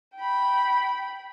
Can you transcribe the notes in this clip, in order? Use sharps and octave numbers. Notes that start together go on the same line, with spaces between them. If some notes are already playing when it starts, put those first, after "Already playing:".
G5 B5